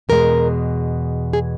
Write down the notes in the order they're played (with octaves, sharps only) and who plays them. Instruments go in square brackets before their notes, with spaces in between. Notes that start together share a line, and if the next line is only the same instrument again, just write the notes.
[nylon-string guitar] E2 B2 G#3 A#4
G#4